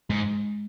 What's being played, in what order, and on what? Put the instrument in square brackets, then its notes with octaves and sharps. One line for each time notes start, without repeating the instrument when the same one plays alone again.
[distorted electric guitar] G#2 [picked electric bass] G#3